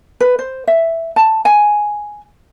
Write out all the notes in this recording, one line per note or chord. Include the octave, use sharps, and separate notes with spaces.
B4
C5
E5
A5
G#5